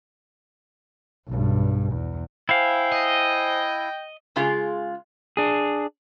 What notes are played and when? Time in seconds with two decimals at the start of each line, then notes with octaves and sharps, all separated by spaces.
1.27 B1 G2
1.94 E2
2.49 E4 C5 F5 G5 G#5
2.92 D#5
4.36 C#3 G#3 F4 G#4
5.37 D4 G#4